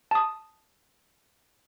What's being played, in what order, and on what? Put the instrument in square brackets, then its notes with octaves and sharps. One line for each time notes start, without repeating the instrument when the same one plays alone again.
[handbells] A5 D#6